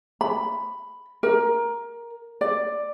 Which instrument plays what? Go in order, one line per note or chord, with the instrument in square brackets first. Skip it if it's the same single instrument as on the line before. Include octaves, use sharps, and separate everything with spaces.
[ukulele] B5
A#4
D5